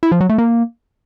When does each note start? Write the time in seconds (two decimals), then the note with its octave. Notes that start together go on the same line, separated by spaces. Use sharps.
0.03 E4
0.12 F3
0.21 F#3
0.29 A3
0.38 A#3